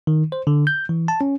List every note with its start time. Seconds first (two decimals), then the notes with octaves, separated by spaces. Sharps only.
0.07 D#3
0.32 C5
0.47 D3
0.67 G6
0.89 E3
1.08 A5
1.21 C#4